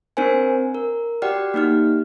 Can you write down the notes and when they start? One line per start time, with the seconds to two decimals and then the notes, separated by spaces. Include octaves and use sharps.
0.17 C4 D4 A#4 C5 G#5
0.75 A#4
1.22 F#4 G4 D5 F#5 G5 F6
1.54 A#3 D#4 G4 F6